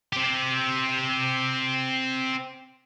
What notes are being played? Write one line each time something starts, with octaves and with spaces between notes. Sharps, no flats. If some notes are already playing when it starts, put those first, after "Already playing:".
C4 G4